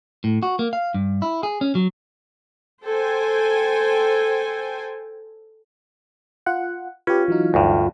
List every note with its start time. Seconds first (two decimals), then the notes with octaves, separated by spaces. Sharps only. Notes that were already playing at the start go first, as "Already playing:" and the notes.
0.24 A2
0.43 F#4
0.59 A#3
0.73 F5
0.94 G2
1.22 E4
1.43 G#4
1.61 C#4
1.75 F#3
2.84 A4 C5 G5 G#5
6.46 F4 F#5
7.07 C#4 F4 G4 B4
7.28 E3 F#3 D#4
7.54 D2 G2